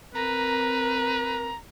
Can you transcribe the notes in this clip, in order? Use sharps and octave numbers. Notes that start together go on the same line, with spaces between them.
C4 A#4 B4 A#5